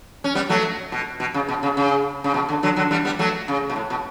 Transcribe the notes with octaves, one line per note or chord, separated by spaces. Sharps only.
C#4
G3 B3
F#3 A3
B2
B2
C#3
B2
C#3
C#3
C#3
B2
D3
D3 F#3
D3 F#3
E3 G3
G3 B3
F#3 A3
C#3
B2
A2
B2